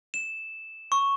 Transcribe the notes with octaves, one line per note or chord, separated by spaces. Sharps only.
E7
C#6